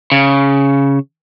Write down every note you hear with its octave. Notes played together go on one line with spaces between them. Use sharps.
C#3